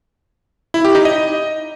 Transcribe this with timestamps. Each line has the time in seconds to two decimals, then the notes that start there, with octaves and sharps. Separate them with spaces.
0.74 E4
0.85 G4
0.95 D#4
1.05 D#5